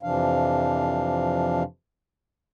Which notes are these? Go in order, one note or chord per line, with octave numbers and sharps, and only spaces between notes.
F2 C3 E3 F3 D4 F5